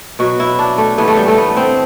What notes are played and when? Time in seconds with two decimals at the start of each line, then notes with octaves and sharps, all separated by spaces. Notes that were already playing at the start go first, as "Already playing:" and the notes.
0.19 B2 F#3 F#4
0.40 E4
0.59 D4
0.78 A3
0.98 A2 E3 G3 B3
1.08 A3
1.17 G3
1.28 A3
1.38 B3
1.57 C4